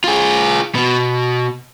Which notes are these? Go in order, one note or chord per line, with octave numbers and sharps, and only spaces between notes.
F4 G#4
B2